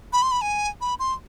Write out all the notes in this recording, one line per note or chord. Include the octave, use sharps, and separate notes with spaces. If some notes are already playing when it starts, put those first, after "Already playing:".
B5
C6
B5
G#5
B5
C6